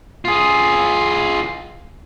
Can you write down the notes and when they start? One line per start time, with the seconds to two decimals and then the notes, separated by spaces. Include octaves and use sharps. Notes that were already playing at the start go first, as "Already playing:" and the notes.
0.25 F4 G#4